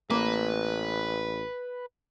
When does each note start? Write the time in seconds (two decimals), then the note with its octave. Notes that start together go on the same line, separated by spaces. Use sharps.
0.10 A1 A#3 B4